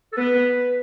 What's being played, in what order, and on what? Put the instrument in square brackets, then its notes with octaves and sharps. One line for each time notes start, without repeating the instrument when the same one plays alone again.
[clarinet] A4
[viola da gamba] B3 [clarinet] B4